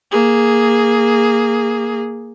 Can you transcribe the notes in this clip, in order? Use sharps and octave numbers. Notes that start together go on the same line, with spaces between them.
A#3 G#4